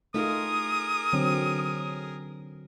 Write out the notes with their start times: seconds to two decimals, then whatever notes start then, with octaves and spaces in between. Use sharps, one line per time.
0.14 A3 D#4 F4 G#4 A#4 D#6
1.13 D3 F#3 C4